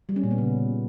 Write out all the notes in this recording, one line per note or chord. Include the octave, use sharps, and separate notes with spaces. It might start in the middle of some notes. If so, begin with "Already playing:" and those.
G3
C#4
A#2
B3
C#3